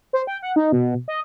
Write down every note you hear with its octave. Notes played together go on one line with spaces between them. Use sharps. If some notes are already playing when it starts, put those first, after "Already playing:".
C5
G5
F#5
D#4
B2
D#5